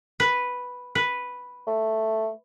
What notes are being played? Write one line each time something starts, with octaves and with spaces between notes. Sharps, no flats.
B4
B4
A3